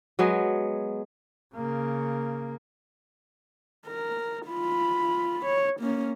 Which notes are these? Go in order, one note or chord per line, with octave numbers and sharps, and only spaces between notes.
F#3 G#3 B3
C#3 A#3
A#4
F4 B5
C#5
A#3 C#4